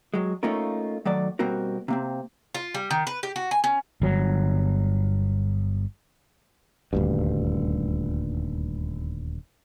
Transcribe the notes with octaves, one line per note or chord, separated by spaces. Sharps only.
F#3 G#3
A3 A#3 C#4 D#4 F4 A#4
D#3 F#3 A3 D5
B2 G3 A#3 C4 F#4 A#4
C3 A#3 C4
F4
G3
D#3
B4
G4
F#4
G#5
C#4
G1 F#3
D#1 D2 G2